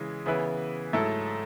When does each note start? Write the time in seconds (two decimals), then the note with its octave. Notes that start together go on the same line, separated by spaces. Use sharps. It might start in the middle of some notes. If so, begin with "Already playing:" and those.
Already playing: C#3 E3 G#3
0.26 C#3 E3 B3 E4 B4
0.93 G#2 F#3 A3 E4 A4